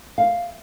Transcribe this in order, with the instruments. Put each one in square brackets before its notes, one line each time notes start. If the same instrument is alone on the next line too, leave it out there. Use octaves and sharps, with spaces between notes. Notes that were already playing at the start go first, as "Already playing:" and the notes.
[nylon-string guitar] F5